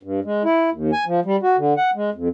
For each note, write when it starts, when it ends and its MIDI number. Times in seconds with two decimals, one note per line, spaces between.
0.03 0.20 43
0.25 0.43 56
0.44 0.70 64
0.72 0.91 39
0.93 1.04 80
1.06 1.20 53
1.25 1.36 55
1.43 1.56 66
1.57 1.74 50
1.77 1.90 78
1.95 2.10 56
2.14 2.28 41